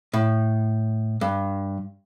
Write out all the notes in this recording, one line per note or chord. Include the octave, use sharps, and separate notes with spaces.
A2
G2